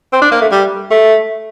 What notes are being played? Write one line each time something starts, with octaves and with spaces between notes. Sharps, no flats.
C4
D4
A#3
A3
G3
A3